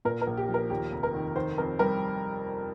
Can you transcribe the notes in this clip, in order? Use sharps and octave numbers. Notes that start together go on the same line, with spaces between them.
A#2 A#4
A#4
A#1
G4
F3
A#4
D#2 G4
F1
A#4
D#3
D#3 C5
F2 A#4
G3 A#4